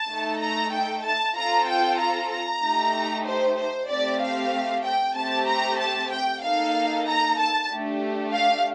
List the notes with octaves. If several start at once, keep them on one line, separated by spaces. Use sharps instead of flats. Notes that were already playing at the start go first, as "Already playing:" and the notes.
Already playing: A5
A3 D#4 A4
A#5
G5
A5
C4 F4 A4 A#5
G5
A#5
A#5
A3 D#4 G4
C5
C5
A3 C4 G4 D5
F5
G5
A3 C4 G4 A5
A#5
A5
G5
A#3 D#4 A4 F5
A#5
A5
A3 D4 G4
F5